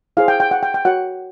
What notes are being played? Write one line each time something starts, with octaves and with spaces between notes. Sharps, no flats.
E4 G#4 C5 F5
G5
G5
F#5
G5
G5
F#4 A#4 C#5 F#5